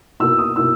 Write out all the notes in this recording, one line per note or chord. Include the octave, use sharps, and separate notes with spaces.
B2 A#3 E4 E6
D#6
B2 A#3 E4 E6